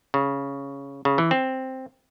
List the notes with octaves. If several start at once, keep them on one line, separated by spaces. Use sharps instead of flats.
C#3
C#3
E3
C4